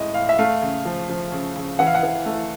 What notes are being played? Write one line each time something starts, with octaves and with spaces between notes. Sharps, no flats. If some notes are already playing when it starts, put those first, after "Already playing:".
Already playing: A2 G#3 D#5
A2 F5
E5
A3 F5
C#3
F3
F3
C#3
C#3
E3 F#5
F5
F#5
E3
A3